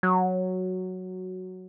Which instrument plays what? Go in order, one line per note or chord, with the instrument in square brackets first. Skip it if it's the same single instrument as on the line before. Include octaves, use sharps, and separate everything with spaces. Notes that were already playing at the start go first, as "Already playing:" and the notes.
[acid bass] F#3